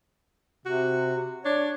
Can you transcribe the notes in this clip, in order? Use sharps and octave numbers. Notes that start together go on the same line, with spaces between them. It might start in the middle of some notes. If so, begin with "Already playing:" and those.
C3 F#4
D4 C#5